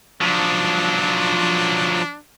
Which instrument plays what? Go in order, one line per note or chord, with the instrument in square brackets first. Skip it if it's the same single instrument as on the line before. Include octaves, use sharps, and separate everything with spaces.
[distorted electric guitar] F3 F#3 [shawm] D4